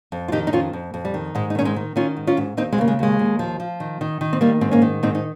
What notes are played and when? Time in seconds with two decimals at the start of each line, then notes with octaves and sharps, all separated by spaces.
0.12 F2
0.28 F4
0.32 D#3 D#4 G4
0.47 D#4
0.53 F2 C#4 F4
0.73 F2
0.94 F2
1.05 G3
1.14 D#3
1.35 G#2 G#3
1.50 D#4
1.55 D#3 C#4
1.65 G#3 C4
1.76 D#3
1.96 D#3 C#4 F4
2.17 G#2
2.27 C#4 F4
2.37 G#2
2.57 D#2 C4 D#4
2.73 G#3 C4
2.78 C#3 A#3
2.88 G#3
2.99 D#2 G#3
3.19 D#2
3.39 F3
3.60 F3
3.80 D#3
4.01 D#3
4.21 D#3
4.33 C4
4.41 D#3 G3 A#3
4.61 G#2 C4
4.71 A#3 C#4
4.82 D#3
5.03 G#2 C4 D#4
5.15 D#4